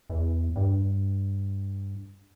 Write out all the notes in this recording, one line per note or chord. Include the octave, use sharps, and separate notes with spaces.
E2
G2